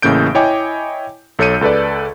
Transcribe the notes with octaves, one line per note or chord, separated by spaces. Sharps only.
A1 A2 C#3 A#3 G6 D7
E4 C#5 D#5 G5 G#5 D6
B1 A4 C#5 G6 C#7 D#7
C#2 A4 B4 D5